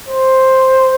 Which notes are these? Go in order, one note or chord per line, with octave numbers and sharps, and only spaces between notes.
C5